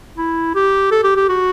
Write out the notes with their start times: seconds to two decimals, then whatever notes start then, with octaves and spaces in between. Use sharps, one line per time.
0.17 E4
0.55 G4
0.91 A4
1.04 G4
1.16 G4
1.29 F#4